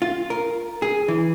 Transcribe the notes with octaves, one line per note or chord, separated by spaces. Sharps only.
F4
A#4
G#4
E3